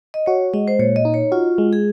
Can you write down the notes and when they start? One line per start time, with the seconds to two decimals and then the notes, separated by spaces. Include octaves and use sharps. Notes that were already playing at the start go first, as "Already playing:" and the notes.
0.14 D#5
0.26 F#4 C#5
0.54 G#3 D#5
0.68 C5
0.79 A#2 C#5
0.96 D#5
1.05 D#4
1.14 C#5
1.32 F4 F#4
1.58 G#3
1.73 G#4